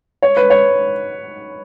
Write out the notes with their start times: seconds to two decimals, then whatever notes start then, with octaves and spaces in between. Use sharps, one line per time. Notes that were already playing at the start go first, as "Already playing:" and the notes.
0.23 C#5
0.37 B4
0.50 C#5